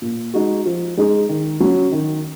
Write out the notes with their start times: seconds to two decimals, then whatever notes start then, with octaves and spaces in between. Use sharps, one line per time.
0.02 A#2
0.34 G#3 D#4 F#4
0.66 F3
0.97 G#3 D#4 G#4
1.29 D#3
1.60 F#3 C#4
1.92 D#3